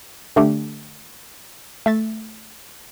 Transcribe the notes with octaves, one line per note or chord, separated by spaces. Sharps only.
D3 A3 D4 G4
A3 E5 A6